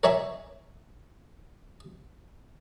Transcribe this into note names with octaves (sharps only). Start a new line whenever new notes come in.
A#4 C#5 E5 G#5 B5